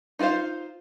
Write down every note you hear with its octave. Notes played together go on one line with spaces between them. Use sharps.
D#4 F4 B4 C5 F5